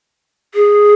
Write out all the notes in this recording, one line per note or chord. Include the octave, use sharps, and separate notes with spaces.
G#4